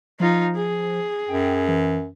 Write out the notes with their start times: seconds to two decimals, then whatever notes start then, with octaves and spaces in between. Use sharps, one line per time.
0.20 F3 D#4 F4
0.55 G#4
1.29 F#2 G5
1.68 E3